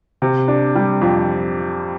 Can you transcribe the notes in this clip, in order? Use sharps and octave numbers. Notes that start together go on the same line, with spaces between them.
C3
D4
G3
F2